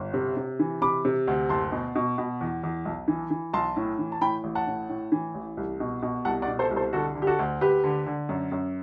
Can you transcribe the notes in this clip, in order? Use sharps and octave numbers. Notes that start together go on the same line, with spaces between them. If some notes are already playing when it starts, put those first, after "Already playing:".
Already playing: G1
C3
C3
E3
C3 B5 D6
C3
D2
F#1 A5 C6
B2
B2
B2
E2
E2
B1
E3
E3
B1 A5 C6
A2
E3
A5
A2 G5 B5
A1
F#5 A5
A2
A2
E3
A1
C2
B2
B2
C2 F#5 A5
D5 F#5
B2
A4 C5
C2
A4 C5
D3 F#4 A4
D3
G4
F#4 A4
D2
D2 G4 B4
D3
D3
F#2
F#2